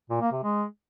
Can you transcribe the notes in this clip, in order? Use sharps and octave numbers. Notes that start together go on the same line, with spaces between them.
A#2
A#3
C3
G#3